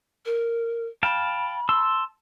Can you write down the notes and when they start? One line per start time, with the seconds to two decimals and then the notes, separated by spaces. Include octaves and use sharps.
0.25 A#4
1.03 F5 G5 A5 B5
1.69 A5 C6 E6